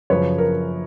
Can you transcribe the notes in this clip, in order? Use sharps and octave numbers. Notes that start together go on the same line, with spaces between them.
F#2 C#3 F3 B4 C#5
A#4